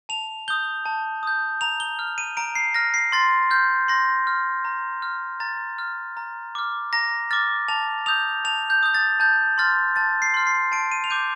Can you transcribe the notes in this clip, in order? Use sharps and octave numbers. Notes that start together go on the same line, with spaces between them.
A5 F7
D#6 G6 G7
A5
D#6 G6
A#5 F7
G7
F6
D#7
A#5 D7
C7
F6 A#6
C7
C6 A6
F6 G6
C6 A#6
F6
A#5
F6
A#5 A6
F6
A#5
D6 F6
A#5 A#6
D6 F6 A6
A5 F7
D#6 G6 F7
A5 F7
G6
D#6 G6
A6
A5 G6
C6 F6 A6
A5 A6
C7
C6 F6
C7
A5 D7
D#7
F7
D6 G6 D#7